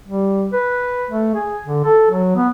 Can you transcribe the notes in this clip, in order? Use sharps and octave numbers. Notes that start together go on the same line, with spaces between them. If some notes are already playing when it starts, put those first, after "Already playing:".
G3
B4
A3
G#4
D3
A4
F#3
B3